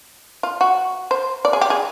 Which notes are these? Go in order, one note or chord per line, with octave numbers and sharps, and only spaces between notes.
F4
F#4
C5
D5
G#4
G4
G#4